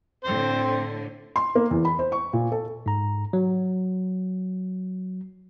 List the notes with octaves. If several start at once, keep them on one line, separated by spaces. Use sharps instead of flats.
A2 D3 C4 C5
C6
A#3
E2
B5
C5
C#6
A#2
A4
G#2 A#5
F#3